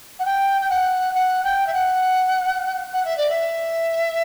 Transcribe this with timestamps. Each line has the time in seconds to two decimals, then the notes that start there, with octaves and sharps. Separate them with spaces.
0.19 F#5
0.25 G5
0.60 G5
0.69 F#5
1.14 F#5
1.43 G5
1.66 E5
1.73 F#5
2.93 F#5
3.04 E5
3.17 D5
3.29 E5